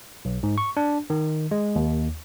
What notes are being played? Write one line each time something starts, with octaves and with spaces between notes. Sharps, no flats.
B1
G#2
C#6
D4
D#3
G#3
D#2